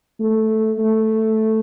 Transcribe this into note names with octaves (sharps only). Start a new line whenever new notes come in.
A3
A3